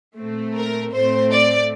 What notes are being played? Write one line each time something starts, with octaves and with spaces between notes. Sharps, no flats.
A#2 A3 C4
A#4
A2 A3 C4 C5
D5